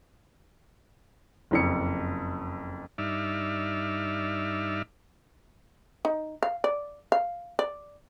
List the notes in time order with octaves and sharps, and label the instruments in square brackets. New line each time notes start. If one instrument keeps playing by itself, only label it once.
[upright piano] F#1 F2 C#7
[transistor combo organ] G2 D#4 D5 E5 F6
[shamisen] D#4
F5
D5
F5
D5